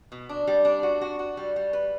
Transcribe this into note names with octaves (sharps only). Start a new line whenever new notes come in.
B2
D4
G3
D4
F#4
F#4
F#4
G3
G3
B4